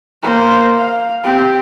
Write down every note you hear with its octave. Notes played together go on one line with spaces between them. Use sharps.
A#3 C5
F5
C4 G4